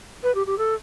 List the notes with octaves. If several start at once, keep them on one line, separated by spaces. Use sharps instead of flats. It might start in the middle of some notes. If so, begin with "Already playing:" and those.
B4
G4
G4
A4